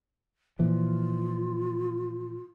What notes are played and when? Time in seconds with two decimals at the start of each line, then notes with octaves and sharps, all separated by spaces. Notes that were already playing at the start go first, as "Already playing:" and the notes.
0.59 A#2 E3 F3 F4